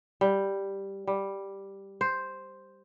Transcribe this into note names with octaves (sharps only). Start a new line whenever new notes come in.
G3
G3
C5